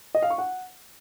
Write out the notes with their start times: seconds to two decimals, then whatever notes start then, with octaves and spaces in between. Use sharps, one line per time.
0.15 D#5
0.22 F5
0.30 C#6
0.38 F#5